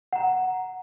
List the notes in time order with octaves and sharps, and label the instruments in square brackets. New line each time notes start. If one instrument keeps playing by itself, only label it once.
[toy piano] F#5 A#5